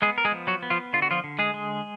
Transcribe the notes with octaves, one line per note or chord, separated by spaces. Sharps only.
G#3 B3 G#4
A#4
G#3 G#4
F3
F#3 F#4
B3
F3 F4
D3 F4
F#4
F3 F4
D3
G#3 G#4
G#3